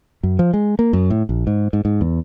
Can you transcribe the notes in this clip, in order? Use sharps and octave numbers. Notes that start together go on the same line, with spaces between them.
F#2
F3
G#3
A#3
F#2
A2
A#1
G#2
G#2
G#2
E2